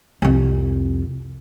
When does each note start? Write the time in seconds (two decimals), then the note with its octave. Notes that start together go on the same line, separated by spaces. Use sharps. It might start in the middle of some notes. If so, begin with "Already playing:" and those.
0.22 C2 F2